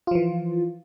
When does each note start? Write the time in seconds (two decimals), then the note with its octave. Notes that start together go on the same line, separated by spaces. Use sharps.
0.07 F4
0.11 F3
0.15 E3